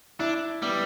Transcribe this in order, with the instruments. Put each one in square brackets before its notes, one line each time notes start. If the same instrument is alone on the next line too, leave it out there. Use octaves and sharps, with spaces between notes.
[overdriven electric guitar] D4 [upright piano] E4
[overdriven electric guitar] G3 [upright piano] B3